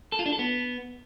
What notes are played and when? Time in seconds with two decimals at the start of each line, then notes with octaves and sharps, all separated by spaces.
0.12 A4
0.19 F4
0.26 D4
0.32 A4
0.39 B3